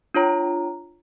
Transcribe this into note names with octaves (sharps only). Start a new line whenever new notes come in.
D4 F4 C#5 A#5